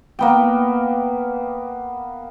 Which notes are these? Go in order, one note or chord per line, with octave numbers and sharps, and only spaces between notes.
A#3 B3 G5